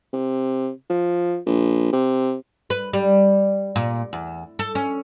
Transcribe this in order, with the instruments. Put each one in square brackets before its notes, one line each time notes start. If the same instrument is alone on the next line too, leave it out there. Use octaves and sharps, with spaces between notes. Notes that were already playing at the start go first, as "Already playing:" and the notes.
[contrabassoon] C3
F3
A#1
C3
[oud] B4
G3
A#2
E2
A4
C#4